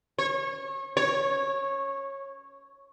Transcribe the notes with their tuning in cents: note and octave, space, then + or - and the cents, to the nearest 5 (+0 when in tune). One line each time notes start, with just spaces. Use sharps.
C#5 -30
C#5 -15